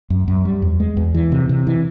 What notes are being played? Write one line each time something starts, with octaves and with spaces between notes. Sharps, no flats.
F#2
F#2
G3
E2
G#3
E2
E3
C3
C3
E3